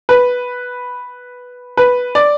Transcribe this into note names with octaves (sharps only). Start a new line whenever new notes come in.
B4
B4
D5